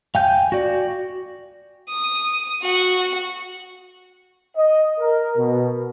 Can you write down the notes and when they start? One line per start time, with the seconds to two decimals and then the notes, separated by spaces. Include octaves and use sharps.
0.15 F5 G5 G#5 G6
0.52 F#4 D5
1.89 D#6
2.62 F#4 F#5
4.56 D#5
4.99 A#4
5.37 B2